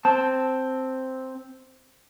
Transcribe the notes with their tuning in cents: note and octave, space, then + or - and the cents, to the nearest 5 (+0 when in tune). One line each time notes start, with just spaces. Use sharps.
C4 +0 A5 +0